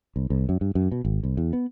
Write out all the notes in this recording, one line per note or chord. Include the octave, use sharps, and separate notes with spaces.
C2
C2
F#2
G2
F#2
B2
G#1
C2
E2
B3